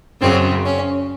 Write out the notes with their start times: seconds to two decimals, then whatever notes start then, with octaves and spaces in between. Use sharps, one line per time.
0.21 F#2 C#3 C4
0.65 C#4